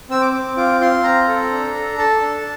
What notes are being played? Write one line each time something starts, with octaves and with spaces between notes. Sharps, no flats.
C4 E6
D6
C4
F4 D6
F4 C6
C4 A#5
A4
D4
A4
A4 A5
D4